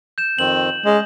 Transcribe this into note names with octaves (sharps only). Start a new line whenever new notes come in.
G6 E7
F2 D#3 C4 F#7
G#3 C#4 D#5